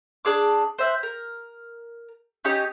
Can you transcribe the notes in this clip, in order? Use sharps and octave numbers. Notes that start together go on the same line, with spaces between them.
D4 G#4 D6
C5 E5 F#6
A#4
C#4 D#4 G4 D#6